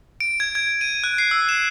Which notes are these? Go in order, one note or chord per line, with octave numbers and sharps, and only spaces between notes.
D7
G#6
G#6
D#7
F#6
C7
E6
E7